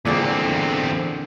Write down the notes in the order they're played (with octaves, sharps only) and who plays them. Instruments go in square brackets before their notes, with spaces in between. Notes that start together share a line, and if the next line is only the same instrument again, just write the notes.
[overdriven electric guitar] E2 C4 [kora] A#2 D3 G#3